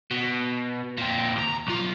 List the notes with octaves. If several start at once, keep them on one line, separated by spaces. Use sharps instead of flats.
B2
A#2 C4
D#2 A#5
B1 F4